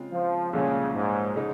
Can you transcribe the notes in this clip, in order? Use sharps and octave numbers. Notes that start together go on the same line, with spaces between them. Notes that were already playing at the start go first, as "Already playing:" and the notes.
Already playing: C#3 G#3 C4 F4
F3
C2 A#2 C#3 F3 G#3 C#4
G#2
C#3 G#3 D#4